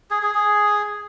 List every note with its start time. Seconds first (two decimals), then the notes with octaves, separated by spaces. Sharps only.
0.11 G#4
0.23 G#4
0.35 G#4